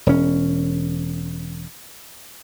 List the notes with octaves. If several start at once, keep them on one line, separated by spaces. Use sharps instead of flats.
E1 C#4